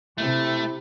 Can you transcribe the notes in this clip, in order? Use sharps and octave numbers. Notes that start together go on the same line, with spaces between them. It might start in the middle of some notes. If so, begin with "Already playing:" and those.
C3 A3 E4